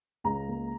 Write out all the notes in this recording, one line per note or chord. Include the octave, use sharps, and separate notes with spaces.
C#2 A#5
A#3